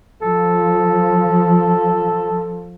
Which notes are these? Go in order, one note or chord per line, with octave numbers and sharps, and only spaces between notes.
F3 A4